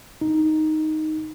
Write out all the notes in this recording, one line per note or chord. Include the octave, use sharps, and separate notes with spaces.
D#4